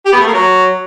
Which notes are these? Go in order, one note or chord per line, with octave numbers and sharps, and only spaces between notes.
G4
B3
A3
A#3
F#3